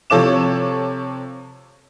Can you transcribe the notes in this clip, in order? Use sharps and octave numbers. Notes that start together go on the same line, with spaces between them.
C3 F3 A4 C#5 D6 E7